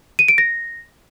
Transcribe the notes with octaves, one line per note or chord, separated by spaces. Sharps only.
D#7
D7
A#6